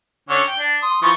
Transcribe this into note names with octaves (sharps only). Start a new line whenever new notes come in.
D3 C#4 C#5
G5
D4
C6 D#6
E3 F3 C#6